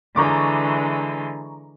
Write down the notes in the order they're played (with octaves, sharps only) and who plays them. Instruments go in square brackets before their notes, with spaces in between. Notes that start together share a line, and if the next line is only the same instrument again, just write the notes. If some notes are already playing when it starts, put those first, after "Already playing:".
[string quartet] D3 E3 G#3 [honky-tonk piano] A#5 C#6 D6